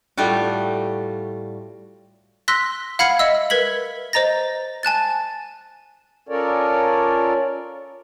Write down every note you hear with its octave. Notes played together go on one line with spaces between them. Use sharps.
A2 G3 A3 F4 F#4
C6 E6 F#6 A#6 B6
F5 F#5 B5 F6 G#6 C#7
D#5 E5 E6
A#4 B4 G#6 B6 F#7
C5 D#5 A#5 A6 A#6
G#5 A5 F#6 A6
C#4 F4 A4 A#4 C#5 D5